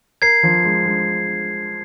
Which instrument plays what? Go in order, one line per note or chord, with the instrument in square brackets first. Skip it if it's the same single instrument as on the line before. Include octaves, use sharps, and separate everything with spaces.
[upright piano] A#4 [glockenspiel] G#6 C7
[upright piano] F3
G#3
G#3